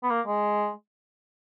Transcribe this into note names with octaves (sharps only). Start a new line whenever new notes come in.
B3
A#3
G#3